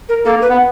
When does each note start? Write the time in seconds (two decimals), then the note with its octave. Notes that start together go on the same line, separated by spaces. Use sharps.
0.09 A#4
0.25 A#3 A4
0.42 B4
0.49 B3